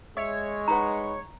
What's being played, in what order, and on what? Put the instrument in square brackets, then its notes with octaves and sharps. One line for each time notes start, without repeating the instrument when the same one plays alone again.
[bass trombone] G#3 [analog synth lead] C#5 [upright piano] E5
[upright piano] D#4 B4 F#5 [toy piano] A#5